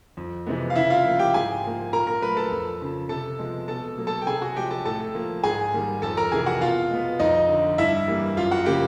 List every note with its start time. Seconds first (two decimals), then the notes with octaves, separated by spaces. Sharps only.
0.17 F2
0.47 C3 E3 G#3 B3
0.70 F5
0.76 C#3 E4 E5
0.90 F4 F5
1.05 F3 A#3
1.19 G4 G5
1.34 G#2 G#4 G#5
1.64 F3 A#3
1.93 A#2 A#4 A#5
2.07 A#4 A#5
2.22 F#3 A3 B4 B5
2.37 A4 A5
2.51 F2
2.81 C#3 F3
3.09 C3 A4 A5
3.39 F3 G#3 B3
3.68 B2 A4 A5
3.97 F#3 A#3
4.07 A4 A5
4.22 G5
4.27 C3 G#4 G#5
4.41 F#4 F#5
4.56 F3 G#3 G4 G5
4.71 A4 A5
4.85 A2 A4 A5
5.15 F3 A#3
5.43 G#2 G#4 G#5
5.73 D#3 G3 A#3
6.02 F2 A4 A5
6.17 A#4 A#5
6.32 C3 E3 G#4 G#5
6.46 F#4 F#5
6.61 B2 F4 F5
6.90 G#3 B3
7.19 F2 D#4 D#5
7.49 D3 F3
7.78 G2 E4 E5
8.07 E3 G3 A#3
8.37 F#2 F4 F5
8.51 F#4 F#5
8.66 C#3 F3 A#3 G4 G5